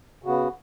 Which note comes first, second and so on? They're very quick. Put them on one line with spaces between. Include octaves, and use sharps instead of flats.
C#3 F#4 B3